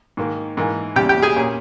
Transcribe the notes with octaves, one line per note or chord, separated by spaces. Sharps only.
G#2 D#3 A#3
G#2 E3 A#3
E2 C#3 G3 G4 G5
G4 G5
G#4 G#5
A#2 A#3 C#4